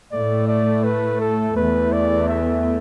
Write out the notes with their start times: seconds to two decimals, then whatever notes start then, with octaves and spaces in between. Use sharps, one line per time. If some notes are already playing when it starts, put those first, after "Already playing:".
0.12 A2 A3 D5
0.48 D5
0.84 B4
1.21 A4
1.57 E2 E3 A3 B4
1.93 D5
2.29 E5